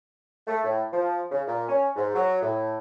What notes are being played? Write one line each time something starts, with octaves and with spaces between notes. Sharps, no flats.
A3
A2
F3
C#3
A#2
C#4
G#2
F#3
A2